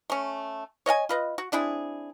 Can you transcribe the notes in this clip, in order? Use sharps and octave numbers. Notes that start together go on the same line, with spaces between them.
A3 C#4
C#5 D#5 F5 G#5
F4 B4 D#5
F#4
C4 D4 E4 G#4